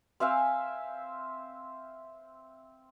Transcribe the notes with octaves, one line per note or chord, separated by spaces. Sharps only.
C4 E5 F5 G#5